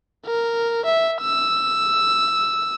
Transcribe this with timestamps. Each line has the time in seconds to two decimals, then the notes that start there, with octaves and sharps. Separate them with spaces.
0.27 A#4
0.86 E5
1.22 E6